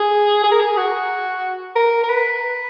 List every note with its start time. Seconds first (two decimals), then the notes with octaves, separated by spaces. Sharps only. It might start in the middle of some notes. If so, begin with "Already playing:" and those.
Already playing: G#4
0.44 G#4
0.52 A#4
0.60 G#4
0.77 F#4
1.76 A#4
2.04 A#4
2.09 B4